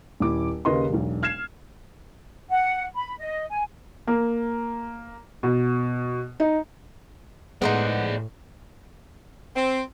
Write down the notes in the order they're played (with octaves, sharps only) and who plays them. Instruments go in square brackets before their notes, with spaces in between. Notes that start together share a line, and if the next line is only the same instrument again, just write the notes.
[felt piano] D#1 E4 D6
D#2 C#3 A#4 B4 D#5 C6
E1 B1
F6 G#6 C7 E7
[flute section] F#5
B5
D#5
G#5
[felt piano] A#3
B2
D#4
[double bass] A2 [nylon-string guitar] G#3 B3 [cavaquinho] D#4 C5 F#5 [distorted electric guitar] G#4 D5
[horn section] C4